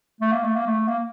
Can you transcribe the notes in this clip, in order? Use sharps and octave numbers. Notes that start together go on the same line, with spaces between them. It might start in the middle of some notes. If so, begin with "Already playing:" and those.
A3
A#3
A3
A#3
A3
A#3